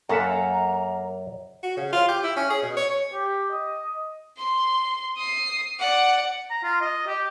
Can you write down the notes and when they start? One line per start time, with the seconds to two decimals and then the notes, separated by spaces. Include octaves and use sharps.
0.09 F#2 A#3 A4 E5 F#5 A#5
1.63 F#4
1.77 C#3
1.93 F4
2.09 G4
2.24 E4
2.37 C#4
2.50 G#4
2.63 B2
2.77 C#5
3.14 G4
3.52 D#5
4.38 C6
5.17 D#6 C7
5.79 D5 F#5
6.50 A#5
6.63 F4
6.81 D#5
7.07 G4